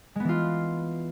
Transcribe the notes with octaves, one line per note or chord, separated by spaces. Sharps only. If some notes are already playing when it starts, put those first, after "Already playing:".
E3 G#3 B3 F4